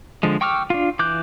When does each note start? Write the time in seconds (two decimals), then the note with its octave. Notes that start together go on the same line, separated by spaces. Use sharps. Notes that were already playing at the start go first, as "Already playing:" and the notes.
0.23 D3 F3 G#3
0.41 G5 C#6 D6 E6 F6
0.70 D4 F4
0.99 E3 D6 F#6 G6